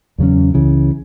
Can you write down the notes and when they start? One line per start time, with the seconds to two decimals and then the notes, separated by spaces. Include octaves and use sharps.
0.18 E2 C#3 F#3 C#4
0.54 C#2 C#3 E3